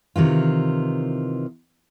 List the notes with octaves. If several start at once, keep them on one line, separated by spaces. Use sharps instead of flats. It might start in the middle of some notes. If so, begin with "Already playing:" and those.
C3 D#3 E3 F4